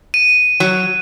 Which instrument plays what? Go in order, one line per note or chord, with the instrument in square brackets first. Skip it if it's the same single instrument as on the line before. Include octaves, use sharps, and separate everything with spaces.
[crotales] D#7
[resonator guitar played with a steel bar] F#3